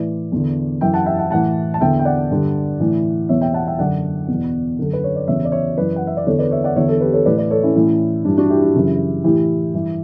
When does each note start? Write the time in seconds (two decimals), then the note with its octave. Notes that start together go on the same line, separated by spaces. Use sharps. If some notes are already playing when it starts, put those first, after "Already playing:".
Already playing: A2 E3 B4 D5
0.32 E2 D3
0.81 F#2 E3 E5 G5
0.94 F#5 A5
1.06 E5 G5
1.18 F#5 A5
1.31 A2 E3 F#5 A5
1.74 A5
1.81 E2 D3 E5 G5
1.99 G5
2.05 D5 F#5
2.30 G2 D3
2.80 A2 E3
3.29 E2 B2 C#5 E5
3.41 E5 G5
3.54 F#5 A5
3.67 E5 G5
3.78 F#2 D3 D5 F#5
4.28 E2 B2
4.79 F#2 D3 A4
4.93 B4
5.04 C#5
5.16 D5
5.27 E2 C#3 E3 C#5 E5
5.45 D5
5.52 C#5 E5
5.77 F#2 E3 B4 D5
5.96 F#5
6.07 E5
6.17 D5
6.26 E2 D3 A4 C#5
6.39 B4 D5
6.51 C#5 E5
6.64 D5 F#5
6.76 E2 D3 C#5 E5
6.88 A4 C#5
7.01 G4 B4
7.13 A4 C#5
7.25 A2 E3 B4 D5
7.38 B4 D5
7.50 A4 C#5
7.63 C#4 E4
7.76 A2 E3
8.25 G2 E3 D4
8.37 D4 F#4
8.50 E4 G4
8.62 E4 G4
8.75 F#2 C#3 E3
9.24 A2 E3 E4 G4
9.74 G2 E3